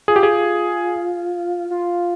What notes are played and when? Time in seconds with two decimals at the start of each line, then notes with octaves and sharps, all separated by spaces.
0.08 F4 G#4
0.16 G4
0.23 G#4
1.71 F4